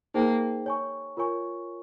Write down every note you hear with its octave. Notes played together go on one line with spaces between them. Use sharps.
A#3 D#4 G#4 C5 G5
C#5 G#5 C#6
F4 A#4 C#5 G#5 C#6